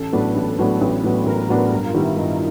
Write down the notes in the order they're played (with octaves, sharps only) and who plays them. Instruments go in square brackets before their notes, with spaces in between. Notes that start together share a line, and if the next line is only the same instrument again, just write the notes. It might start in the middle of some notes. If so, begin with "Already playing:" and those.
Already playing: [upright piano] A1 [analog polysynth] A4
[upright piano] A2 F#3 B3 D4 [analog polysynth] B4
[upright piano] A1
A2 F#3 B3 D4
A1
A2 F#3 B3 D4
[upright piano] A1 [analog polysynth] A#4
[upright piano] A2 F#3 B3 D4
[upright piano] G2 [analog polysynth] A#4
[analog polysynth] F4
[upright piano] D#3 G3 B3 [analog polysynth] E4
[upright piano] G2 [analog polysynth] D#4